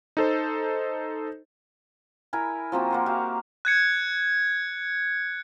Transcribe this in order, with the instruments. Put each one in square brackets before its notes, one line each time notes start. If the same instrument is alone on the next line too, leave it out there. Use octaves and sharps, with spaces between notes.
[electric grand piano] D#4 A4 C5
[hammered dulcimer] E4 A#4 G#5 B5
F3 A#3 C4 F#4
A#3 F#5 C6
F#4 G4 E5 F5
[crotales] F#6 G#6 C#7